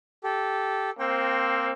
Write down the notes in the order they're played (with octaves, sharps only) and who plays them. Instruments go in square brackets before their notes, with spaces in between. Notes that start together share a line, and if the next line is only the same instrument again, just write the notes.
[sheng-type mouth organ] G4 A4
[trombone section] A#3 C4 [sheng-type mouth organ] G5